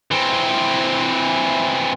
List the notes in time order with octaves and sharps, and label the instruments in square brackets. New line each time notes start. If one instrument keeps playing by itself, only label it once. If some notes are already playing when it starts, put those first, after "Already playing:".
[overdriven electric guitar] E3 C4